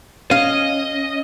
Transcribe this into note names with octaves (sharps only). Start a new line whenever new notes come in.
C#4 D#5 F5